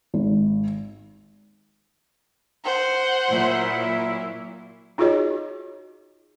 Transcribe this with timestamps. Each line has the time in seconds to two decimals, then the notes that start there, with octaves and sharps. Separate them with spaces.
0.14 G#1
2.64 C5 F#5
3.28 A#2 F#3 E4
4.98 D#4 F4 F#4 G#4 C#5 D#5